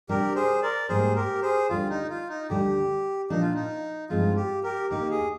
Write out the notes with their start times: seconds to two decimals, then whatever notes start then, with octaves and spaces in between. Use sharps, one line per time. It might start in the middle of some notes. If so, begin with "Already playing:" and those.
0.09 C3 G3 D4 G4 A#4
0.35 G#4 C5
0.62 A#4 D5
0.89 G#2 G3 A#3 G#4 C5
1.16 G4 A#4
1.42 G#4 C5
1.69 D2 D3 G3 F4
1.89 D#4
2.10 F4
2.29 D#4
2.50 D2 D3 G3 G4
3.30 A#2 F3 A#3 D4 D#4
3.41 F4
3.54 D#4
4.09 G2 F3 G#3 C4 D#4 F4
4.36 G4
4.63 G4 A#4
4.90 D#2 D#3 A#3 D#4 G4
5.10 G#4